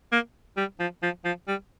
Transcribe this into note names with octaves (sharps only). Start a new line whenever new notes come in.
A#3
G3
F3
F3
F3
G3